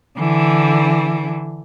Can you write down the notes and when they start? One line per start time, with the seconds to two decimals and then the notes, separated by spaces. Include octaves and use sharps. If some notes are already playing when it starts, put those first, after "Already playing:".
0.18 D3 E3